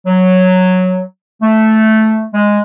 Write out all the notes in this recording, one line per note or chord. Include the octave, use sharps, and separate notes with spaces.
F#3
A3
G#3